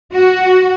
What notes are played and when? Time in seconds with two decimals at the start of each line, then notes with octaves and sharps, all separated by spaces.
0.13 F#4